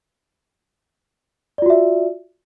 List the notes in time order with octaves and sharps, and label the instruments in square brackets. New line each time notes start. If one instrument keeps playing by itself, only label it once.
[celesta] D5
F4
F#4
E5